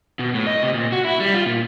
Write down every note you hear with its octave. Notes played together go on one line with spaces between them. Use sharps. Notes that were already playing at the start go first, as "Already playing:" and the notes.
B2
A2
D#5
C3
A#2
F#4
E4
G3
F4
A#2